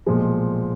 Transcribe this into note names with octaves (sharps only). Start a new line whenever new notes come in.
B1 A#2 F3 G#3